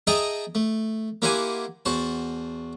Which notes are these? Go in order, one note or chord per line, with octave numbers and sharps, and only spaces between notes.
G#4 D#5 E5 G5 A5 A#5
A3
A#3 E4 G4 C5 F#5 G#5
E2 F#4 C5 A5